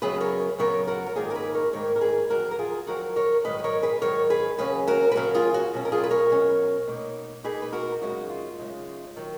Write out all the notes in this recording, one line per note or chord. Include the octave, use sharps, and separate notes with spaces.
F#2 C#3 F#3 B3 G#4 B4
A#4 C#5
F#2 C#3 F#3 B3 A#4 C#5
F#4 A#4
A#4
G#2 D#3 A#3 D#4 F4 G#4
A#4
G#4 B4
A#4 C#5
G#2 D#3 A#3 D#4 A#4 C#5
A#4
G#4 B4
F2 D#3 F#3 F#4 A#4
A#4
F4 G#4
F2 D#3 F#3 F#4 A#4
A#4 C#5
G#2 D#3 F#3 B4 D#5
B4
A#4 C#5
G#4 B4
G#2 D#3 F#3 A#4 C#5
G#4 B4
D#2 C#3 F#3 C#4 G#4 B4
F#4 A#4
B4
D#2 C#3 F#3 C#4 F#4 A#4
F4 G#4
F#4
B2 F#3 C#4
A#4
F4 G#4
B4
A#4 C#5
B2 F#3 C#4
B2 A#3 D#4
B2 A#3 D#4 G#4 B4
B4
F#4 A#4
F#2 C#3 G#3 D#4 F#4
F4
F#2 C#3 G#3 D#4
D#3 F#3